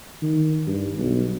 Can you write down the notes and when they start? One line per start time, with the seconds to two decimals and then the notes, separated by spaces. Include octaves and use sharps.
0.22 D#3
0.67 G2
0.97 B1